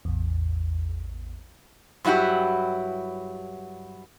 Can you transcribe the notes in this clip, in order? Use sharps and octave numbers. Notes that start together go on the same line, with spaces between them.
A1 E2
G2 F#3 E4 F#4 G4